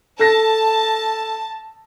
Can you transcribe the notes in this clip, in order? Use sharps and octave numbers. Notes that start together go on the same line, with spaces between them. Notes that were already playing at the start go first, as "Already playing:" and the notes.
A4 A5 A#6